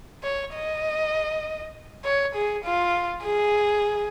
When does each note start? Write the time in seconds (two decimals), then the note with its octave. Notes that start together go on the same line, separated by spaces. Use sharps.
0.23 C#5
0.55 D#5
2.05 C#5
2.35 G#4
2.65 F4
3.25 G#4